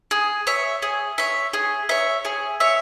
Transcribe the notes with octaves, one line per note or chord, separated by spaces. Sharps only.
G#4
C#5 E5
G#4
C#5 E5
G#4
C#5 E5
G#4
C#5 E5